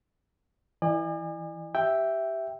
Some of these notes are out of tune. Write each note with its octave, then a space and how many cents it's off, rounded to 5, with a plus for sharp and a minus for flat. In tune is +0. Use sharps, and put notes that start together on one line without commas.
E3 +0 D5 +45 G#5 -30
G4 -10 E5 +0 G5 +0